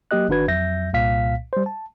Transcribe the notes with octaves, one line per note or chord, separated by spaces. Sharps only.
F#3 A#3 G4 D#5 F#6
G1 D#3 D4 F#4 B4 G#6
F2 F#3 E5 G6 A#6
C2 A#2 F5 B6
G3 C5
A5